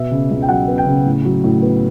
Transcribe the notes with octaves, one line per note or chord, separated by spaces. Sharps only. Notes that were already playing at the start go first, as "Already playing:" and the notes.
Already playing: B2 B3 E5
C#3
C#2
G5
F#3 F#5
B3
G5
C#3
A2
F#3
A2
B3